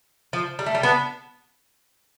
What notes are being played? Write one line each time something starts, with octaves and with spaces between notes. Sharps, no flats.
F3
G3
A3
G3
B3 D4